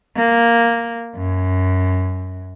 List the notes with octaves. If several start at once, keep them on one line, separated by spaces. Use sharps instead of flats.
A#3
F#2